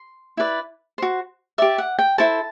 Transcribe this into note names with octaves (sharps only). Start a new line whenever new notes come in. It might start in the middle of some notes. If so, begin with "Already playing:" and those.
Already playing: C6
E4 B4 D5
F#4 C5
G4 D5 E5
F#5
G5
E4 A4 C5 A5